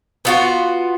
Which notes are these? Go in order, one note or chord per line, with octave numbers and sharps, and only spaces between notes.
B3 F4 F#4